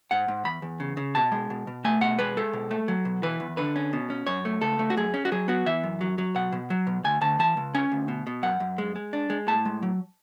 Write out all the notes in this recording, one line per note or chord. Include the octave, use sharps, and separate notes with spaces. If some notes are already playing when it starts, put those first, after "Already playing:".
G#2 F#5
G#2
E2 B5
E2
C#3
C#3
B2 A5
G#3
B2
B2
A3 G#5
B2 F#5
G#3 B4
G#3 A4
B2
A3
F#3
B2
E3 B4
E2
D3 B4
C#4
B2
C#4
F#2 C#5
A3
C#2 A4
A3
F#4
F#2 G#4
C#4
F#4
F#3 G#4
B3 F#4
E3 E5
F#2
F#3
F#3
B2 F#5
B2
F#3
B2
D2 G#5
D2 A5
E3 A5
C#2
C#4 G#5
D2
B2
B2
F#2 F#5
F#2
G#3
G#3
D4
G#3
A2 A5
G#3
F#3